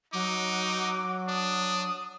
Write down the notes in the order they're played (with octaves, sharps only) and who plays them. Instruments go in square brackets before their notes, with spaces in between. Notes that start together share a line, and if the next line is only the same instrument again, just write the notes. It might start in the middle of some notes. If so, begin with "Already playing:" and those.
[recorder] F#3 [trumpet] D#4 [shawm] D6
[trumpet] D4 [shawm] D#6